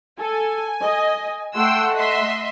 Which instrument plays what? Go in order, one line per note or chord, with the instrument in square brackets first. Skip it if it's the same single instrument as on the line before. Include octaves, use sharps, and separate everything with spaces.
[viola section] A4 [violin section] G#5
[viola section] D#5
[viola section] A3 F#5 [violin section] G5 C6 E6
[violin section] D#5 E5 C6